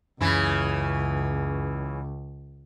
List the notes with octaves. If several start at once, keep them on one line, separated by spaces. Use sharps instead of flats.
C#2 F#2 C#3 E3 E4